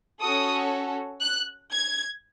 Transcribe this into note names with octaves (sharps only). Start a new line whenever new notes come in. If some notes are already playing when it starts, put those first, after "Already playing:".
C#4 F#4 A4 D#6
F#6
G#6